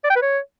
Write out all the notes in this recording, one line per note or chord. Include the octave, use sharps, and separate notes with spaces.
D5
G5
B4
C#5